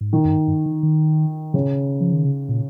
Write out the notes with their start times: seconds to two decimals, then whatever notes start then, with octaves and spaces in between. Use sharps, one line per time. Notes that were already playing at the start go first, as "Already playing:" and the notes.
0.01 G#2
0.12 A#2 D#3
0.25 F2
0.30 G2
0.48 G2
0.66 D#3
0.83 D#3
1.54 C#3
2.01 F3
2.13 D#3
2.25 C#3
2.49 A#2